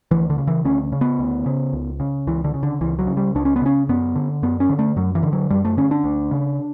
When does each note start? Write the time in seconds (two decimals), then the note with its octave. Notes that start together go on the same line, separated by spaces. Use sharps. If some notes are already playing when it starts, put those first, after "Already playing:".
0.11 D2 E3
0.30 D3
0.38 C#3
0.47 E3
0.65 D2 C#4
0.92 C#3
1.01 B3
1.19 D2
1.46 C#3
1.73 C#2
2.00 C#3
2.27 C#2 E3
2.44 D3
2.54 C#3
2.63 D3
2.81 C#2 E3
2.99 F#3
3.07 C#3
3.17 G3
3.35 C#2 D4
3.45 C#4
3.56 B3
3.62 C#3 C#4
3.89 F#2 B3
4.15 D3
4.43 F#2 B3
4.60 C#4
4.69 D3
4.79 A3
4.96 F#2 F#3
5.15 E3
5.23 D3
5.33 F#3
5.50 F#2 G3
5.65 A3
5.77 D3 C#4
5.91 D4
6.04 D2
6.31 C#3